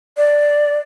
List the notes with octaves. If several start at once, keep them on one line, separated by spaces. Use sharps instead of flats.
D5